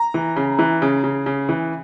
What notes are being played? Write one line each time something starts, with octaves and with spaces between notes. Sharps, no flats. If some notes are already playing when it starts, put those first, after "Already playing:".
Already playing: A#5
E3
C#3
E3
C#3
C#3
C#3
E3